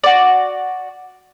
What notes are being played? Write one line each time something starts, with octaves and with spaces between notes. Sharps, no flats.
F#4 D5